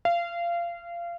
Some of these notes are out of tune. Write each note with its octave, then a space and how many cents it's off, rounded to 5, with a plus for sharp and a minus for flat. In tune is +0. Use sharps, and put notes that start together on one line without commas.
F5 -25